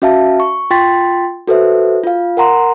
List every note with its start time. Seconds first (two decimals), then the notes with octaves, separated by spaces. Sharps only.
0.02 C#4 F#4 E5 F5 A5
0.40 C#6
0.71 F4 G5 C6 A6 B6
1.48 F#4 A4 B4 C5 E5
2.04 F4 F5
2.37 A#4 F#5 A#5 C6